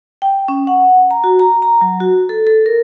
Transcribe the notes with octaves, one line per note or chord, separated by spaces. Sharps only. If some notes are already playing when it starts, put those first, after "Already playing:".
G5
C#4
F#5
A#5
F#4
A#5
A#5
F#3
F#4
A4
A4
A#4